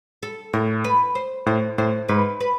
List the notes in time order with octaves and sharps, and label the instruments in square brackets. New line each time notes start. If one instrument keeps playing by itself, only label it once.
[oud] A4
[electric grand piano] A2 [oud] A#4
[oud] B4
C5
[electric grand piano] A2 [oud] C5
[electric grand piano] A2 [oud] C5
[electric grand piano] G#2 [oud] B4
[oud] B4